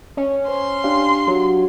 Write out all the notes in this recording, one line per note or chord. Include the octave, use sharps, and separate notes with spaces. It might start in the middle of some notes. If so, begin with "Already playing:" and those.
C#4
C5 C6
D4 G4 F5
F#3